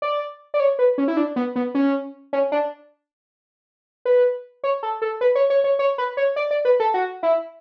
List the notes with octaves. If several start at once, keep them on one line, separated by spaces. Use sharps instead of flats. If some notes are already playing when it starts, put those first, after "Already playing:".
D5
D5
C#5
B4
C#4
E4
D4
B3
B3
C#4
C#4
D4
B4
C#5
A4
A4
B4
C#5
C#5
C#5
C#5
B4
C#5
D5
D5
B4
A4
F#4
E4